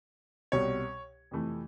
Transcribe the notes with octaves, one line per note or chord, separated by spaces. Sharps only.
C2 B2 G3 C#5
F2 C3 E3 A3